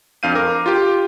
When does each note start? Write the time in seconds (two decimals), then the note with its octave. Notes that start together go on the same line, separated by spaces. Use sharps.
0.23 F2 D4 F5 G6 D#7
0.35 A#4 D6
0.66 F4 G4